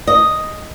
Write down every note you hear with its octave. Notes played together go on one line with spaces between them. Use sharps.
D#5